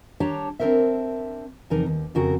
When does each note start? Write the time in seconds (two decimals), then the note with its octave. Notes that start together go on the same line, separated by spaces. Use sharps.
0.20 D4 G4 C#5 A5 A#5
0.59 C4 D4 A#4 C5 E5
1.70 E2 C3 F3 D#4 A#4 A#5
1.86 D#2
2.15 F2 C#3 C4 F#4 A#4